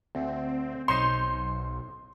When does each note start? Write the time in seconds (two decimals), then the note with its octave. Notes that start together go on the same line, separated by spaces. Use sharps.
0.15 D2 C4
0.88 B1 D#4 C5 C#5 C6